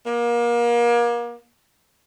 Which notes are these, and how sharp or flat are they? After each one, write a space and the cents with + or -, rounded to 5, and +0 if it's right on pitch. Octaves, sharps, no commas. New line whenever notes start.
A#3 +30